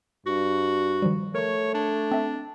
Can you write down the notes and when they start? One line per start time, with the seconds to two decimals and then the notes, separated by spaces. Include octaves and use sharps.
0.27 G2 F#4
1.02 D#3 F3 G3
1.35 A3 A#4 C#5 C#6
1.75 D4
2.11 C4 E5